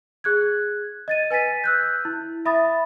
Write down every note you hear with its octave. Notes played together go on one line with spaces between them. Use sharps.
G#4 F#6 G#6
D#5 A6 D#7
B4 G#5 A6 B6 D#7
E6 F#6 G6
E4
E5 B5 D#6 A6